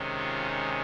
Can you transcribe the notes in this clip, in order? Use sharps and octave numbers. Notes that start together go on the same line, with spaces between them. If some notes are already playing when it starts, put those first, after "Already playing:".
Already playing: C3 D#3 G#3 C#4
F4
D#4